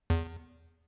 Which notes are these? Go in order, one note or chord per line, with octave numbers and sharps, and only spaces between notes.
E2